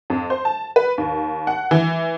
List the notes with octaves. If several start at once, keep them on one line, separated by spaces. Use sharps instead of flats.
F2
C5
A5
B4
D#2
F#5
E3